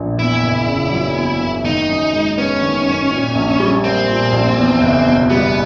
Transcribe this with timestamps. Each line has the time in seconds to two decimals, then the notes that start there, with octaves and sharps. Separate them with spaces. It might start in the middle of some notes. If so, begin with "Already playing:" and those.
Already playing: A#1 A#2
0.18 E2 E4
0.43 F#1
0.67 C#3
0.92 F#3
1.16 E2
1.40 F#1
1.65 D#3 D#4
1.89 F#2
2.13 G#3
2.38 B3 C#4
2.62 D#3
2.87 F#2
3.11 A#2
3.35 A#1
3.60 G3
3.84 A#3 C4
4.08 A#2
4.32 A#1
4.57 E2
4.81 F#1
5.06 B2
5.30 G3 B3